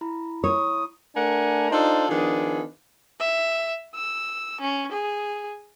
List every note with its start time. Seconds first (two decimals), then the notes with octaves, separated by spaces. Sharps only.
0.01 E4 A#5 B5
0.44 C#5 D#6
1.16 A3 D4 A#4 F#5 G#5
1.71 D4 D#4 F4 A4 C5
2.09 D#3 F3 B3 D4 G#4
3.20 E5
3.95 E6
4.61 C#4
4.92 G#4